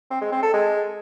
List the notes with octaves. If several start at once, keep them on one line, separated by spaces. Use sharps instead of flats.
C4
G#3
C4
A4
G#3